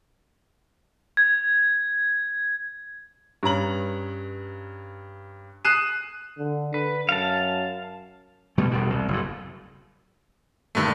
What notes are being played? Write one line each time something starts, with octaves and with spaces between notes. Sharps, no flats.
G#6
G2 C#4 A#5 F#7
D#6 F#6 C7 D#7 E7
D3
D3 B4
F#2 F5 A5
B2 G3 A3
E1 B2 G3
C2
F#1 A2
G2 A#2 D3 D#3 A3